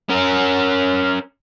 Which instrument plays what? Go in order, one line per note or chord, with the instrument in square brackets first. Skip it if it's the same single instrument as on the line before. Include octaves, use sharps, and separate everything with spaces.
[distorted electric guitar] C#4 A#4